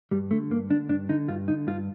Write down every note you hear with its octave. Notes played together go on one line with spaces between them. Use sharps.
G2 G3
D3 A3
G2 A#3
D3 D4
G2 D4
D3 D#4
G2 F4
D3 D#4
G2 F4